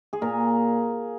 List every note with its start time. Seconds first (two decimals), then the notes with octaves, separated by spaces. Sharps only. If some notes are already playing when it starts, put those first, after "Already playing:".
0.13 G#4
0.22 A#2 A#4